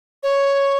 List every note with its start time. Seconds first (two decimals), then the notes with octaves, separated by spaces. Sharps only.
0.23 C#5